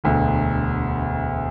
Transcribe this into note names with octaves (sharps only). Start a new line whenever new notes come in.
E1 D2 D3